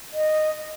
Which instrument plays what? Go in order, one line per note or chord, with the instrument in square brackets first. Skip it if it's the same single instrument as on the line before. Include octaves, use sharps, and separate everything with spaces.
[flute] D#5